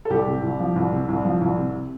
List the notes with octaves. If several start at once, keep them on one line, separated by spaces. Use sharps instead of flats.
A4
C2 G4
C3
C2
F3
C2
C3
C2
F3
C2
C3